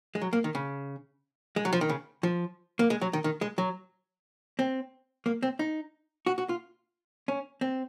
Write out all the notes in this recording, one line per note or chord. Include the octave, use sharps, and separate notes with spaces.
G#3
F#3
A#3
D#3
C#3
G#3
F#3
F3
D#3
C#3
F3
A#3
G#3
F#3
D#3
D#3
G#3
F#3
C4
A#3
C4
D#4
F#4
F#4
F4
C#4
C4